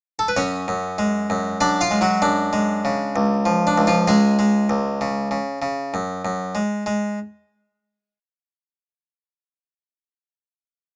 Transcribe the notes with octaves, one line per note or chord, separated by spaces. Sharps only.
A4
B4
F#2 C#4 C#5
F#2
G#3
F#2
F#2 D4 D5
F4 F5
G#3
F#3 F#4
F#2 D4
G#3
C#3
C#2
F3
D4
C#2
F3 F4
C#2 G#3 G#4
G#3
C#2
C#3
C#3
C#3
F#2
F#2
G#3
G#3